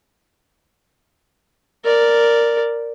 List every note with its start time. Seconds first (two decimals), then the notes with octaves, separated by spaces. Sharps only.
1.84 A#4 D5